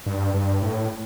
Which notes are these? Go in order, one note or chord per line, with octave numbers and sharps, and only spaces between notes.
G2
G2
A2